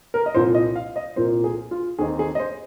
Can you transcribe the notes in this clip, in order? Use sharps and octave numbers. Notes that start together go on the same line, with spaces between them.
A#4
D#5
C2 A#2 F3 C5
D#5
F5
D#5
C2 A#2 F3 A#3 C5
G#4
F4
D#2 D#3 C4 D#4 G#4
G#4
D#5
C5